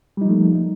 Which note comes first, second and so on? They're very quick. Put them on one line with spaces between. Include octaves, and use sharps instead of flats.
G3 D#4 F3 A3 A#3